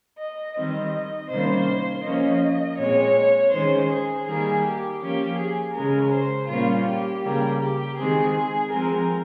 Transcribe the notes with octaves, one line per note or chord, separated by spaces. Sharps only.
D#5
D#3 G3 C4 D#5
C3 D#3 G3 A#3 C#4 C5
F3 A#3 C#4 D#5
A#2 G#3 C4 C#5
D#3 G#3 C#4 C5
G#4
D#3 G3 A#3 G#4
G4
F3 A#3 C#4 G4
G#4
C#3 G#3 C#4 A#4
C5
A#2 G3 A#3 C#4 F4
G4
C#3 G3 A#3
G4
D#3 G#3 C4 G#4
F3 G#3 C4 A#4